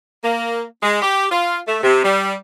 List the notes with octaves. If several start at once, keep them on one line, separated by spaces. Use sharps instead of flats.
A#3
G#3
G4
F4
A3
C3
G3